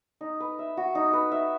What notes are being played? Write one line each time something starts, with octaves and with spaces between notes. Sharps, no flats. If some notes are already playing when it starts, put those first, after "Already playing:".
D#4
B4
E5
F#4
D#4
B4
E5